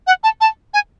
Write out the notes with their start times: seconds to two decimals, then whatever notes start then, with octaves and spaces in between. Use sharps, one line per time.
0.07 F#5
0.24 A5
0.41 A5
0.74 G#5